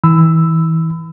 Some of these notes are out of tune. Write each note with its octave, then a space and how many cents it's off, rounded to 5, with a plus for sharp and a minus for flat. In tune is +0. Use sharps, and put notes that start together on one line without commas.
E3 -30 B5 +30 E6 +0